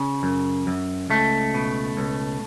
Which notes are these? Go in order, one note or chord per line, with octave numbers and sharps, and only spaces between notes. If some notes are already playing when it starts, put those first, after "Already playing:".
Already playing: C#3
F#2
F#2
C#2 A3
B2
C#2